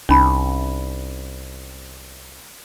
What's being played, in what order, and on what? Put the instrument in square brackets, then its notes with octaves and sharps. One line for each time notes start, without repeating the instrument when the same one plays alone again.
[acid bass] C2 [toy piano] C#4 D#4 B5